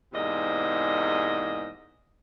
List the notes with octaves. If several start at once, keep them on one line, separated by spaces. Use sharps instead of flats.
E2 G#2 C3 A#3 D5 D#5